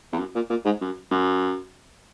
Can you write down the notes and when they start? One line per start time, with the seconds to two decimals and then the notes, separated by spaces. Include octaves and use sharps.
0.13 E2
0.19 F#2
0.35 A#2
0.50 A#2
0.65 G#2
0.81 F#2
1.11 F#2